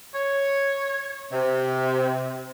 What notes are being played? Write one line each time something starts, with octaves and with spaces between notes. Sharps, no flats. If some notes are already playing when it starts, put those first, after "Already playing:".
C#5
C3